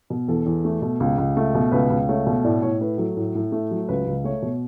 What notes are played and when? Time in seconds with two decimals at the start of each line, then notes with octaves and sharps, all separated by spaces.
0.10 B2
0.28 E2 A4
0.46 E2
0.65 A3
0.82 B2
1.00 C#2
1.18 C#2
1.37 A3
1.54 B2
1.72 C#2 B4
1.90 C#2
2.08 A3 C#5
2.26 B2
2.44 A2 D5
2.62 A2 C#5
2.81 A3 B4
2.98 F#3 A4
3.17 A2
3.35 A2
3.52 A3
3.71 F#3
3.89 C#2 B4
4.07 C#2
4.24 A3 C#5
4.42 B2